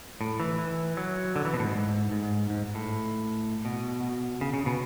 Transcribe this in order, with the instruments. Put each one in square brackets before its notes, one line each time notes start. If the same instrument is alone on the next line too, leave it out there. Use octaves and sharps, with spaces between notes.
[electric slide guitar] A2
E3
E3
F#3
D3
E3
B2
A2
G#2
G#2
G#2
A2
B2
C#3
C#3
B2